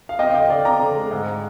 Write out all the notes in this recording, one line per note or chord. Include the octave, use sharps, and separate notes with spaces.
F5
C4 D#5 G5
F5
D3 D#5 G5
D3 D5 F5
C4 A#5 D6
D3
G#3
G#2